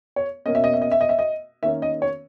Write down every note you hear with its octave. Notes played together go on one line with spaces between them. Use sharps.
C#5
B2 A#3 C#4 D#5
E5
D#5
E5
D#5
E5
D#5
E5
D#5
D#3 A#3 C#4 E5
D#5
C#5